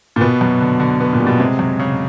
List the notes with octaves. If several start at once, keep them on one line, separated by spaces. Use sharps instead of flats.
A#2
B2 B3
F#2
D3
D3
B3
A#2
G3
B2
C3 G#3
F#2
C#3